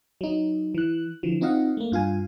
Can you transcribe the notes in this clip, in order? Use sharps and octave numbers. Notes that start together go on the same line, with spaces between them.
F#3 D#4
E3 F#6
D3 E3 F3
C4 D#4 F4 D#5 F5 F#5
A3 A#3
G2 F4 F5 G#5